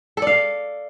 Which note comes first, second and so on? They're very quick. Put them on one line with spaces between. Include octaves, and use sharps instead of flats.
A4 D5 F5